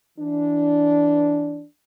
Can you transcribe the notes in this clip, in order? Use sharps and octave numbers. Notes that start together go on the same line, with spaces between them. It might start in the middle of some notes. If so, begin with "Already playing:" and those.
E3 D4